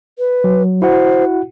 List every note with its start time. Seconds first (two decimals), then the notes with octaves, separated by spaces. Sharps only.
0.19 B4
0.44 F#3
0.82 E4 F#4 C5 F#5